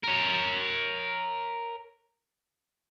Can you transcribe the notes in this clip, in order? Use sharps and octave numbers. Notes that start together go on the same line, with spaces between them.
A#4 C#5